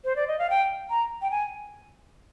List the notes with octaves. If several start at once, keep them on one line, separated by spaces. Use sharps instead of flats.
C5
D5
D#5
F5
G5
A#5
G5
G#5